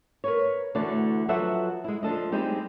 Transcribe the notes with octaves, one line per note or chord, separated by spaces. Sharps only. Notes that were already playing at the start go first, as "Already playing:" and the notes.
A#4 B4 C#5
D2 D3 E3 A3 F#4 D5
F3 F#3 A4 B4 E5 F#5
G#3 E4
F3 D4 A4 D#5
G3 G#3 C4 D#4 G4